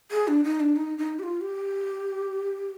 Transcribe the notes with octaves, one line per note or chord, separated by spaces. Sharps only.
G#4
D4
D#4
D4
D#4
D#4
G4
F4
G4